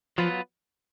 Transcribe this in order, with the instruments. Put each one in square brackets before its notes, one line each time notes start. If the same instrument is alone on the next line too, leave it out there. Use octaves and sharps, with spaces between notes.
[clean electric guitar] F3 [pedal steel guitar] F#3 B3 F4 B4